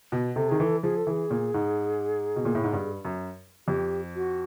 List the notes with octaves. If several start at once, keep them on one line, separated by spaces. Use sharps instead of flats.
B2
C3 A4
D#3 G#4
E3 A4
F3 G#4
A4
E3 G#4
A#2
G#2
B2
A#2
A2
G#2
G2
F#2
F2 G4
F#4